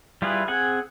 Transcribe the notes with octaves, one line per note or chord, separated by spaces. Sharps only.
G3 E4 F4 G#4 B4
C4 G#4 F#5 G#5